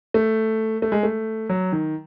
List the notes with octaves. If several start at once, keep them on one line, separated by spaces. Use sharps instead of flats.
A3
A3
G#3
A3
F#3
D#3